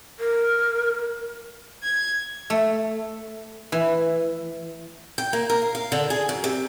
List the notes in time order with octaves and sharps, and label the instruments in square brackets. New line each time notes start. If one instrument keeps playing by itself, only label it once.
[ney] A#4
[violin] G#6
[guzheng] A3
E3
[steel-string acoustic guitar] G5
A#3
A#4
F5
F5
D3
G#4
F#2
C3